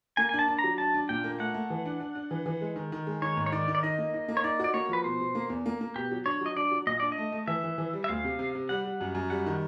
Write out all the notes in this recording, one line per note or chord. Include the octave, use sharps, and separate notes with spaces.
A#3 G#5
G#5
D4
A5
D4
A#5
F#3
D4 A5
D4
A#2 G5
A#3
A3 F#5
A3
E3
D4
D4
D4
E3
E3
G#3
D#3
D#3
G#3
D#3 C#5
G#2
C#5
D#3 D5
D#3
D5
D#4 D#5
A#3
D#4
A#3
C#5
D#4 D5
F#4 D5
A#3 C#5
F3 B4
B2 C5
B2
A#3
E2
A#3
A#3
B2 G4
F#3
D4 C#5
F#3 D#5
D4 D5
F#3
A#2 D#5
D4 D5
D#5
A3
A3
E3 E5
E3
E3
G3
E5
D2 F5
C3
C3
C3
G3 F#5
G3
F#2
F#2
G3 F#5
D#3